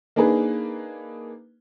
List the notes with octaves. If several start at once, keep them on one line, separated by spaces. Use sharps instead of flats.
A#3 D4 D#4 G#4 B4